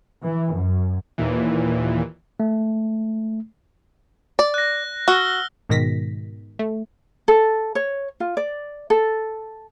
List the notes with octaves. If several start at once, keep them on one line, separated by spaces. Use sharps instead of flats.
E3
F#2
D#2 A#2 E3
A3
D5
F#6 A#6
F#4 E6 F6 G7
G#2 B2 D#3 A#6 B6
A3
A4
C#5
F4
D5
A4